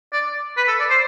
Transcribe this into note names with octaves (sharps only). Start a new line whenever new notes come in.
D5
B4
A4
D5
C5